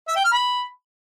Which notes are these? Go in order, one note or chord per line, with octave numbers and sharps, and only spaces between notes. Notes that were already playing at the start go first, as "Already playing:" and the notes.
E5
G5
F6
B5